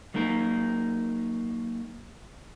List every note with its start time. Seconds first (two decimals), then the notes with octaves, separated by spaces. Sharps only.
0.14 F#3 A#3 D#4 A#4